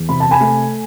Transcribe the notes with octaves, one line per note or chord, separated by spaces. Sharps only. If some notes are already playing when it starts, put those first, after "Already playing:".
Already playing: E2
C3 B5
A5
G#5 B5
A3